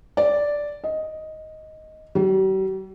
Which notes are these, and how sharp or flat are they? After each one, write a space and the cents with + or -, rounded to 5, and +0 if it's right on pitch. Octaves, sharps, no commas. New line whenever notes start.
D5 -5
D#5 +5
G3 -45